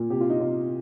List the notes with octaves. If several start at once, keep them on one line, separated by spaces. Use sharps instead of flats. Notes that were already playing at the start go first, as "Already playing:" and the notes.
Already playing: A#2
C3 G4
F4
D#4
C3 F4